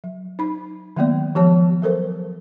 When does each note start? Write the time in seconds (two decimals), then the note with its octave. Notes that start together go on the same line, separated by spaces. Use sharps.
0.04 F#3
0.39 D#4 B5
0.96 D#3 F#3 G#3 A#3 B3 D5
1.35 F3 G#3 G4 C#5 A5
1.82 F#3 A4 A#4 C5